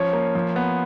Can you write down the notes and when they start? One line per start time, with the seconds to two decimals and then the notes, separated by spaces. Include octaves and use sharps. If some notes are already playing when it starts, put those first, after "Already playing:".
Already playing: F3 C#4 C#5
0.13 A#3
0.35 F3
0.56 B3